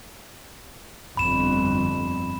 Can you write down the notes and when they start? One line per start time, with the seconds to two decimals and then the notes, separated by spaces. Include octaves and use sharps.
1.17 G1 F2 B5 E7